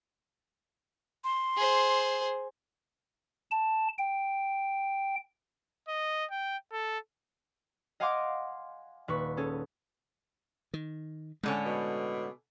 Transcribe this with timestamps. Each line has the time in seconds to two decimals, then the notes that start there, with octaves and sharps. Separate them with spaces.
1.24 C6
1.57 G#4 C5
3.51 A5
3.98 G5
5.88 D#5
6.31 G5
6.72 A4
8.00 D#5 F5 F#5 G#5 C6 D6
9.08 D#1 B4 C#6
9.37 C#4 G#4 A4
10.74 D#3
11.43 A2 D3 G#3 C#4
11.65 B2